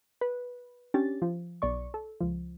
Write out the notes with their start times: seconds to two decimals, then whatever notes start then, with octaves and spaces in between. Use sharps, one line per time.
0.21 B4
0.94 C#4 D4 G4 A6
1.22 F3
1.62 B1 D5 C#6
1.94 A4
2.21 C#2 F3